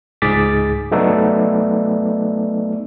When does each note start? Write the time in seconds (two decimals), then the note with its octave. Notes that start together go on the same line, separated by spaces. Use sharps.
0.22 C#2 G#2 G#4 D6 A6 B6
0.91 F#3 A3 B3 D#4 A4 D5